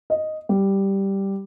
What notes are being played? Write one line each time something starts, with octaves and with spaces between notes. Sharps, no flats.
D#5
G3